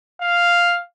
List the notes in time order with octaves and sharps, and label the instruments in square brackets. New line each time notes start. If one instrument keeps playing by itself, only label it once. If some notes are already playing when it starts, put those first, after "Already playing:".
[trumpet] F5